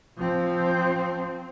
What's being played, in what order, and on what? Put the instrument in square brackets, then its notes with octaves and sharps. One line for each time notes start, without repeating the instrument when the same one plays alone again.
[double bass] F3 C4